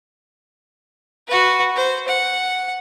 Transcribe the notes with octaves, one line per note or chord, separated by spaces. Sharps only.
F#4 B4
C5
F#5